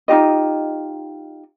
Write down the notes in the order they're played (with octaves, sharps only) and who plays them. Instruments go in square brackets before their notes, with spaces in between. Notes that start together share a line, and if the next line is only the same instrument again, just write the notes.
[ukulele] D#4 F4 G4 D#5